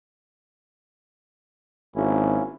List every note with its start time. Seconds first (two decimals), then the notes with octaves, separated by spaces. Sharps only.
1.96 G#1 A#3 C#4 E4